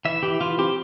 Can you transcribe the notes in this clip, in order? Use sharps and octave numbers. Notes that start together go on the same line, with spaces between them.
E3 E5
E3 G4
E3 F4
C4 G4